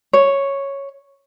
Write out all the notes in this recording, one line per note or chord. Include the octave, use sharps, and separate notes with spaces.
C#5